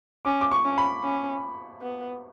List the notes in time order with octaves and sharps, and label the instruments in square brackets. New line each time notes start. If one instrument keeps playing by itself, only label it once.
[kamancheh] C#4 [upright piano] D6
[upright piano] D6
C#6
[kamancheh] C#4
[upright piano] B5
[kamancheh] C#4
B3